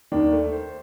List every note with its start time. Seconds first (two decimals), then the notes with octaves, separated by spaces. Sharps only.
0.12 D#2 D#3 D4
0.32 A3
0.53 C5